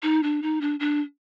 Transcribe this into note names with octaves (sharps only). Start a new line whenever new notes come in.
D#4
D4
D#4
D4
D4